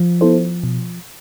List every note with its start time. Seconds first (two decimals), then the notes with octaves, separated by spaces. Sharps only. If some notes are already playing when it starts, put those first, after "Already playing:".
Already playing: F3
0.21 B3 E4 A4 C5
0.63 B2